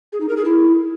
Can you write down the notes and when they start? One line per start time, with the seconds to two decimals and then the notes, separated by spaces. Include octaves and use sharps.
0.13 G#4
0.21 D#4
0.29 A#4
0.37 G#4
0.45 E4